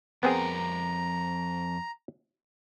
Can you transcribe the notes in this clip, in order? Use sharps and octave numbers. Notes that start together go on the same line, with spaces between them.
F2 B3 C4 G#4 A#4 A#5